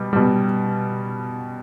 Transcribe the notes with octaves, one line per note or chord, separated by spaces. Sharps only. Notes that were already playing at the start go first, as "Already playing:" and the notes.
Already playing: B2 G3
B2 G3